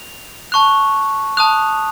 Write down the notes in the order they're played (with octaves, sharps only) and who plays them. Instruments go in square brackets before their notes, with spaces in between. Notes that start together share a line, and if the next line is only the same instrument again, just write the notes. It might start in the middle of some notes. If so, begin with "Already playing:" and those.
Already playing: [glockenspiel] F7
A5 C#6 F#6 F7
A5 D#6 F#6 F7